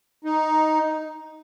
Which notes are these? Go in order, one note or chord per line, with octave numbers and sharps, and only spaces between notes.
D#4